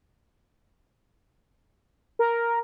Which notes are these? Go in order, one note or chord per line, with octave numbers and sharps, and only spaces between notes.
A#4